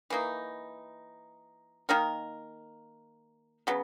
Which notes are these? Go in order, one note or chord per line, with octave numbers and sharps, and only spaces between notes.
E3 A#3 D#4
D#3 A#3 D#4 A#4
C#3 F#3 B3